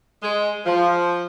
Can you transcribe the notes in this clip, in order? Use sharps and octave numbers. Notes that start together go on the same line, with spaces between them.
G#3
F3